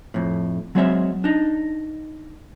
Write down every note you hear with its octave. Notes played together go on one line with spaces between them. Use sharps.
F2 A2
F#3 G#3 C4 C#5 D#5 E5
D4 D#4